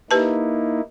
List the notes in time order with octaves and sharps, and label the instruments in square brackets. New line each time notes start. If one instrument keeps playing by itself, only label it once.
[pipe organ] A#3 D#4 E4 [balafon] G4 B4 A5